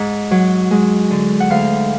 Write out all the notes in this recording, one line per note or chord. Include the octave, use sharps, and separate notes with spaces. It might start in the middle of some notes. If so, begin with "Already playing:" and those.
Already playing: G#2 D#5
F#3
G#3
D3
F#5
D2 F5